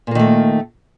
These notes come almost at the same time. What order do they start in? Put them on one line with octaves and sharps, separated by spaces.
A#2 A#3 D#3 A3